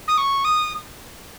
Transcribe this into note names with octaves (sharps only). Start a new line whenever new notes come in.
D#6
C#6
D#6